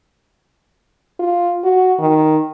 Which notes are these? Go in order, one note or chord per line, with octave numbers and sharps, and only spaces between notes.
F4
F#4
D#3